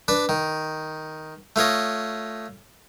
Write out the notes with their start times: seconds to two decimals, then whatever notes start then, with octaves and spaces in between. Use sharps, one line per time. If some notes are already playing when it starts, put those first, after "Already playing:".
0.08 D4 B4 D5
0.29 D#3
1.56 A3 F4 C#5 D#5